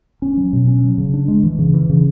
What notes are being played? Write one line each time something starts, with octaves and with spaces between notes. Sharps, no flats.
C#4
F#3
B2
C#4
F#3
C#3
D4
G#3
E3
C#3
E3
C#3